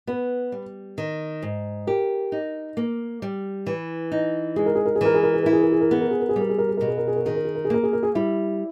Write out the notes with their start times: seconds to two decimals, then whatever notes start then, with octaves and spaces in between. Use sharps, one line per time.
0.07 B3 B4
0.52 G3
0.98 D#3
1.42 G#2
1.87 G4 A#4
2.32 D#4
2.77 A#3
3.22 G3
3.67 E3
4.12 D#4
4.56 G#3 G#4
4.66 A#4
4.75 G#4
4.86 A#4
4.95 G#4
5.01 E3 A#4
5.14 G#4
5.23 A#4
5.34 G#4
5.43 E4 A#4
5.53 G#4
5.62 A#4
5.72 G#4
5.81 A#4
5.91 B3 G#4
6.01 A#4
6.11 G#4
6.20 A#4
6.29 G#4
6.36 G3 A#4
6.49 G#4
6.58 A#4
6.69 G#4
6.77 B2 A#4
6.88 G#4
6.98 A#4
7.07 G#4
7.16 A#4
7.26 D#3 G#4
7.35 A#4
7.45 G#4
7.55 A#4
7.65 G#4
7.70 A#3 A#4
7.83 G#4
7.93 A#4
8.03 G#4
8.15 G3 E4